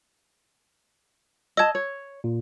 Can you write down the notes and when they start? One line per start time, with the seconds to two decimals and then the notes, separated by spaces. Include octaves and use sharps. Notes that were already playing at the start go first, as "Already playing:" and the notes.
1.57 D#5 A5 E6 G#6
1.75 C#5
2.24 A#2